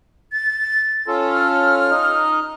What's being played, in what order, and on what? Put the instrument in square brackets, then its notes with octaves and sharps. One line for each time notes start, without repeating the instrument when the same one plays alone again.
[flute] A6
[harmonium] C#4 F4 A4
[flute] F6
[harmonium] D#4 D#5